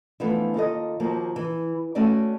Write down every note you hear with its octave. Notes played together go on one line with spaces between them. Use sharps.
E3 F3 A3 B3 D4 F4
D#2 F4 A4 D#5
D#2 F3 A#3 F#4
E3
A3 C#4 F#4 D5 G5